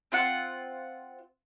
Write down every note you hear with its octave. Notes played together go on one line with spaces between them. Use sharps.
C4 F4 F#5